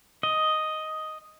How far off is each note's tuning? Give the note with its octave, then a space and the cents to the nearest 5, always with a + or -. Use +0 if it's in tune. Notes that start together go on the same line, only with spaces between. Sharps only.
D#5 +5